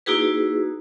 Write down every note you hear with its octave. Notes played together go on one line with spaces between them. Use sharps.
A#3 D#4 E4 F#4 G#4 B4